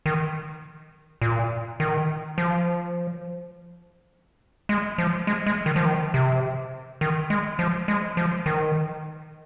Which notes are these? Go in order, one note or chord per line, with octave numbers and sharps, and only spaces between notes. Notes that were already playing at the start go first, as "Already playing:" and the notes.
D#3
A#2
D#3
F3
G#3
F3
G#3
G#3
D#3
F3
D#3
C3
D#3
G#3
F3
G#3
F3
D#3